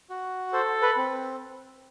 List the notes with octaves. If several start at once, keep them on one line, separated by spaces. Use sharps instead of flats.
F#4
A4 C5
B4
C4